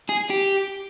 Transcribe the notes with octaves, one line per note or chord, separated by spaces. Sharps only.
G#4
G4